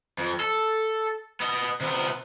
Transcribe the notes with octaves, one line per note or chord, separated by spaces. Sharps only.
F2
A4
B3 D#5
C3 B3